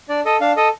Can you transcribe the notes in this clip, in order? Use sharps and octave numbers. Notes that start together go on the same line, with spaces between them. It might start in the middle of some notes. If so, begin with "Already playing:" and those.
D4 D5
A4 D#5
D4 F5
A4 D#5